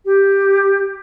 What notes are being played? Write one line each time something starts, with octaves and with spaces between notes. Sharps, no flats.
G4